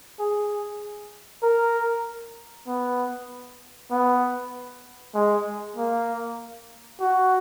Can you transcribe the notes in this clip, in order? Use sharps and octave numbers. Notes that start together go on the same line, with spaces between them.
G#4
A#4
B3
B3
G#3
A#3
F#4